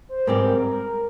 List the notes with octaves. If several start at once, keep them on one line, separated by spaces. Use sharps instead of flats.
C5
G#2 G3 C4 G4 A#4
A#4